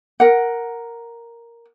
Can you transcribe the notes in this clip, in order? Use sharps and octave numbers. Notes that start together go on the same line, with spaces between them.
A#4 F#5